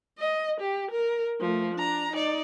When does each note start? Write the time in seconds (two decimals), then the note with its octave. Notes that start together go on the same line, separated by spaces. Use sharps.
0.19 D#5
0.60 G4
0.91 A#4
1.41 F3 A3
1.74 D4 A#5
2.12 D#4 D5